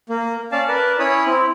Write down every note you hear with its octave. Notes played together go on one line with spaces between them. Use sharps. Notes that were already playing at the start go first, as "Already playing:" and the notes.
A#3
C#4 D5 F5 A5
A#4 B4 D5 A5
C#4 E4 C#5 B5 D#6
C4 E4